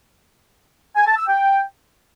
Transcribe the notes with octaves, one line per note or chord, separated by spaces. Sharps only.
G#5
A5
E6
G5